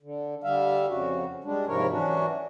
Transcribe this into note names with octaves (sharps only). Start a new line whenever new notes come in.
D3
D3 G3 E5 F5
F2 C#3 F#4
G3 G#3 D4
G#2 C3 F3 E4 A#4 C#5
E3 F#3 C#4 D4 F#4